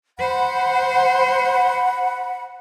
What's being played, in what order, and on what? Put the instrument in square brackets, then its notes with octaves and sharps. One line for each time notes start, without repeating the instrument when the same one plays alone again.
[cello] C5 [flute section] F#5 B5